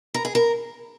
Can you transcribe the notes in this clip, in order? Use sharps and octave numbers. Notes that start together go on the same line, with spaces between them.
A#4
G#4
A#4